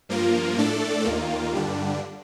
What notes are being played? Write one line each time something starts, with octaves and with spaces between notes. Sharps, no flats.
G2 F3 A#3 F4 A#4
A2 A3 D4 A4 D5
D#2 D#3 A#3 F4
G2 D3 G3 D4